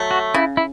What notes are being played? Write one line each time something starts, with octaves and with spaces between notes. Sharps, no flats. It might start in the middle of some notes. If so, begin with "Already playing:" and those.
Already playing: F#3 A3
F#4
C#3 E4
E4